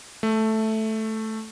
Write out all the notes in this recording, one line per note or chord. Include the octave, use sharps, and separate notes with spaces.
A3